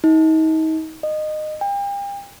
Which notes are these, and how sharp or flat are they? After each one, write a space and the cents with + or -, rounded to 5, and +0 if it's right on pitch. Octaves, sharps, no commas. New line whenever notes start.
D#4 +35
D#5 -20
G5 +40